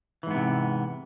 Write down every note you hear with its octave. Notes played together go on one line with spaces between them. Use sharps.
G#2 C3 E3 B3